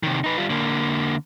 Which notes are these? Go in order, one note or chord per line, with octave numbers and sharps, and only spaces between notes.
C3 D#3
D#4 B4
G3 F4
D3 A#3